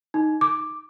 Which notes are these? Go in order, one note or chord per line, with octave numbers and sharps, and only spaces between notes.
D#4
D6